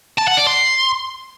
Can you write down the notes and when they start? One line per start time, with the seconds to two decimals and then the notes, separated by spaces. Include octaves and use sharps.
0.18 A5
0.27 F#5
0.37 D5
0.47 C6